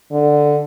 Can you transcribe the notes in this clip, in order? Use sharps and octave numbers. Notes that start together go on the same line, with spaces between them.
D3